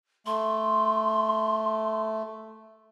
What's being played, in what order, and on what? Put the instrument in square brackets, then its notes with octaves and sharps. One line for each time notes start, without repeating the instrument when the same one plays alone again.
[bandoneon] A3 [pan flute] C6